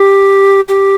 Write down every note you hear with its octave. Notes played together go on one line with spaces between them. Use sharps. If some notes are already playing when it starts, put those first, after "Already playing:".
Already playing: G4
G4